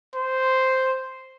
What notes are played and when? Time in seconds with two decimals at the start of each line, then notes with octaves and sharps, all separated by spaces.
0.15 C5